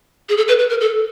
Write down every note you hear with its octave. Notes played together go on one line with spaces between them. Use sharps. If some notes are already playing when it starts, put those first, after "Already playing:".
G#4
A4
B4
B4
A#4
A4